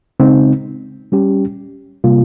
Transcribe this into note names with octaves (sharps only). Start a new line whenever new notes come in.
C#3 G#3 C4 D#4
G3 C#4 G4
C3 G3 A#3 F4